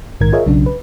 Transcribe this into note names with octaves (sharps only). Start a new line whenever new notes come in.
A#1 G#2 D#3 A#4 G#6
F4 G#4 A#4 C#5 D#5 E5
B1 C#3 F#3 D4
B4